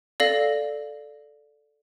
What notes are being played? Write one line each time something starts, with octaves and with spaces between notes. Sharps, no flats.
A4 D5 F5 A#6